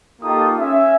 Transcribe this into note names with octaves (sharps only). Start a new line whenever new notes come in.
A#3 D#4 F4 G4 A4 D#6
C#4 E5